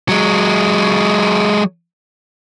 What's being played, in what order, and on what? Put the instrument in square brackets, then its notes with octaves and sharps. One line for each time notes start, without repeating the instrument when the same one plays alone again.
[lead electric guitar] F#3 G#3